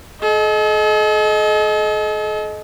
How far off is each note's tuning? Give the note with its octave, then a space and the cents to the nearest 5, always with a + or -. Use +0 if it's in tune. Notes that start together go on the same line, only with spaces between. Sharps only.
A4 -45 D#5 +0